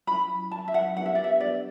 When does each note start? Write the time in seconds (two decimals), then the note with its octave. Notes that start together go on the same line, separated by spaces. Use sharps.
0.07 F#3 C#4 E4 B5
0.51 F#3 C#4 E4 A5
0.68 E5
0.74 F#5
0.97 B3 D4 G4 B4 F#5
1.06 E5
1.15 D5
1.24 E5
1.40 B3 D4 G4 B4 D5